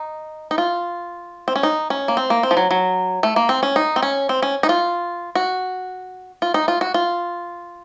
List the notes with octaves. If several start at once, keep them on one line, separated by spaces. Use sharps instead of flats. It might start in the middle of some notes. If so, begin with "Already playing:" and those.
Already playing: D#4
D#4
F4
C4
C#4
D#4
C#4
A#3
C4
A#3
C4
F3
F#3
F#3
A3
A#3
C4
C#4
D#4
C4
C#4
C4
C#4
D#4
F4
F#4
F4
D#4
F4
F#4
F4